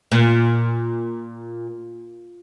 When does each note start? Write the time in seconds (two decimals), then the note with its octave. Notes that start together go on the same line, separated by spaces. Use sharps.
0.12 A#2